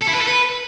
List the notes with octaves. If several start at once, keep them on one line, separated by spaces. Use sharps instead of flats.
A4
E4
B4
A4
B4